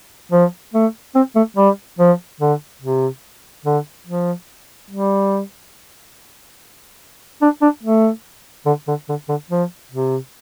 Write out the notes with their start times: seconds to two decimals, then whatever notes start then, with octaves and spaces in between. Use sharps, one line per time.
0.32 F3
0.74 A3
1.15 C4
1.36 A3
1.57 G3
1.99 F3
2.40 D3
2.82 C3
3.65 D3
4.07 F3
4.91 G3
7.42 D4
7.62 D4
7.83 A3
8.66 D3
8.88 D3
9.09 D3
9.29 D3
9.51 F3
9.92 C3